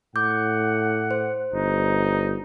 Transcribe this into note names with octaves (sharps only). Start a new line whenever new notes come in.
A2 F#5 D6 G6
C5
G1 D#4